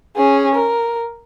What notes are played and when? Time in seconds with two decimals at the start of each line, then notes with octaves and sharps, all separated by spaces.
0.17 C#4 G#4
0.55 A#4